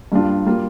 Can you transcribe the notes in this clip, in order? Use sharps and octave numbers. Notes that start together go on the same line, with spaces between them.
G2 G3 A#3 D4 F4
G3 A#3 F4